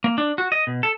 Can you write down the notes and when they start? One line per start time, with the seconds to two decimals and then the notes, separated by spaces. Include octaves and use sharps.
0.04 A#3
0.18 D4
0.38 F#4
0.52 D#5
0.67 B2
0.83 A4